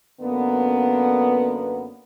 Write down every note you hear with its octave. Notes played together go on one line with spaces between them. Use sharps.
F#2 D3 A#3 B3